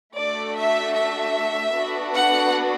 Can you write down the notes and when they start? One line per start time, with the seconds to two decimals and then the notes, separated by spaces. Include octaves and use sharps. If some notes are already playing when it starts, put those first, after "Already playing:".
0.16 A3 D4 F#4 A4 D5
0.57 E5
0.96 E5
1.75 B3 D4 F#4 A4
2.14 F#5